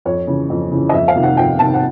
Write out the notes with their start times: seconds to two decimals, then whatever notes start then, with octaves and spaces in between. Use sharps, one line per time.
0.05 F2 C#5
0.27 C#3 E3
0.50 F2
0.71 C#3 E3
0.89 D#5
0.93 F2 E5
1.08 F5
1.15 C3 D#3
1.23 F#5
1.37 F2 G5
1.59 C3 D#3 A5
1.74 F#5